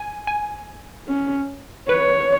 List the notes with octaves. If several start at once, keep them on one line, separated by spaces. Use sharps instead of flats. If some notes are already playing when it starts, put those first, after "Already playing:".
Already playing: G#5
G#5
C#4
B4 C#5